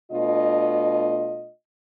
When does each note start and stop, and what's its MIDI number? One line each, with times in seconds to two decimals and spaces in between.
0.12 1.50 47
0.12 1.50 57
0.12 1.50 62
0.12 1.50 65
0.12 1.50 75